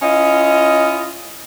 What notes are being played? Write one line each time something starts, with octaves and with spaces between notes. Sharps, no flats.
C#4 E4 F4 D#5